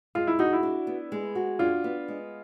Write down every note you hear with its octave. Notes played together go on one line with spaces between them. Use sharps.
G#3 F4
E4
D#4 F#4
E4
D4
B3
G#3
F#4
D4 F4
B3
G#3